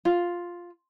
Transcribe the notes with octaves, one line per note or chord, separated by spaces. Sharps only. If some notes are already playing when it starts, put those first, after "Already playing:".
F4